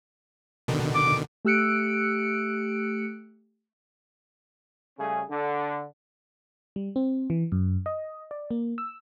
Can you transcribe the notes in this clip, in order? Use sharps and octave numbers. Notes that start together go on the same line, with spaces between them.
B2 D3 D#3
D6
A3 G4 E6 F#6 C#7 D7
C#3 G3 A3 C#4 G#4
D3
G3
C4
E3
F#2
D#5
D5
A#3
E6